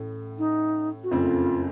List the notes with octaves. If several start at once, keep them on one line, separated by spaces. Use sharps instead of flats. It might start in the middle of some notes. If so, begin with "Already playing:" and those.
Already playing: A1 A2 A3
D#4
F#4
F#1 F2 C#3 A3 C4 F4